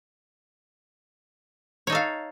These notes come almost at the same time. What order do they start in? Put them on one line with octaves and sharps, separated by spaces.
C#5 D#4 A4 F5